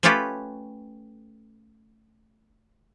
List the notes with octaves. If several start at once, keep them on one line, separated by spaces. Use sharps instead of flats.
A3 C#4 F4 G4 A4 B4